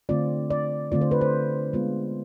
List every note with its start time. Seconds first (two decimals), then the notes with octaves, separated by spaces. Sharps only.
0.09 D3 A3 C4 F4 D5
0.51 D5
0.92 D3 A3 C4 F4 D5
1.01 C5
1.11 B4
1.21 C5
1.73 G#3 B3 F4